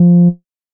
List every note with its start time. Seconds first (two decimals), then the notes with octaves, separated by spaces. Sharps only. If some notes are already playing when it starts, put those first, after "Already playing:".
Already playing: F3